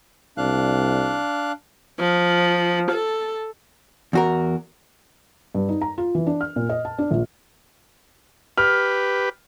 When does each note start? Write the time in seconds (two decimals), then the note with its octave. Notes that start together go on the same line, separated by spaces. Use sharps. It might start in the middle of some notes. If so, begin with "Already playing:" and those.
0.37 C2 D4 F5 F#6
1.98 F3
2.90 A4
4.13 E2 F#4 A#4
5.55 G2
5.69 D#4
5.82 A#5
5.98 F4
6.15 E3
6.27 D4
6.41 F6
6.56 A#2
6.69 D#5
6.85 A5
6.98 D4
7.11 A#1
8.58 G4 B4 F6